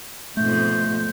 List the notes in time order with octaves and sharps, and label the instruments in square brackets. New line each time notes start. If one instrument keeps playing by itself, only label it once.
[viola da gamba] F2 G#2 B2 [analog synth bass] A3 [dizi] G6